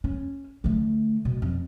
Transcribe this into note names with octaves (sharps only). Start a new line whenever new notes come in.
C#4
D3 A3
B2
F2